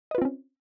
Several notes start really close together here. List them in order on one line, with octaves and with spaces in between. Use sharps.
D#5 B4 F4 C4 C#4